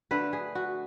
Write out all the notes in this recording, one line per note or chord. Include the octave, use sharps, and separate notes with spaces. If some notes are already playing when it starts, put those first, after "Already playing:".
D3 A3 B4
G#4
F#4